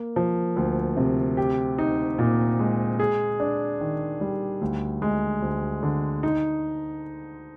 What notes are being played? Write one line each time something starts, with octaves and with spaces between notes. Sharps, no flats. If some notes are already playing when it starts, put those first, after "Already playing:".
Already playing: A#3
F3
D2
C3
G4
D#4
A#2
G#3
G#4
D4
D#3
G3
D2
G#3
D2
D3
D#4